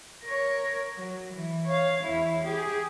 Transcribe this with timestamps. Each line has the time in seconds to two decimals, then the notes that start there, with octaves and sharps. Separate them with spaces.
0.24 A#4 C#5
0.96 F#3
1.33 E3
1.66 C#5 F5
2.03 E2 E4
2.43 G4 G#4